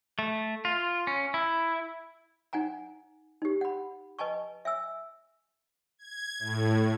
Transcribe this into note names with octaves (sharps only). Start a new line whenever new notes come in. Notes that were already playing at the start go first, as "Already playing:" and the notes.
A3
F4
C#4
E4
D#4 F#5 G#5 A#5
D#4 G4
F#5 B5
B4 D#5 G#5 A5 C#6
E5 G#5 E6
G#6
A2